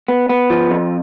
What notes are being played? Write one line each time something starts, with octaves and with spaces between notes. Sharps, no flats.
B3
B3
F3
F2